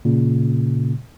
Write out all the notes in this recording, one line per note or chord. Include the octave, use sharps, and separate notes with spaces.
A#2 C#3